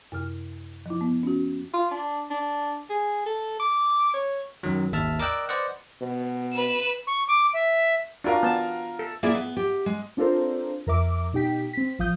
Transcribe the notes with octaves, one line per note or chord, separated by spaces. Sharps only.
F#2 C3 F6
F3 E4
B3
C#4 F#4
F4
D4
D4
G#4
A4
D6
C#5
F#2 D#3 F#3
G#1 D#2 E5 A5 F6
A#4 D5 D#5 G5 E6 F#6
B4 C5 D5 D#5 F#5
B2
B4 E7
C#6
D6
E5
D4 F4 F#4 A#4 F5
B3 A5
A4
A#3 E4 G#4 D5 E5
B3
G4
G#3
C4 D4 F4 A4 A#4 C5
F2 A#4 E5 D6
B2 D#4 G4 G5 B6
C4 B6
A1 F3 F5 D#6 G6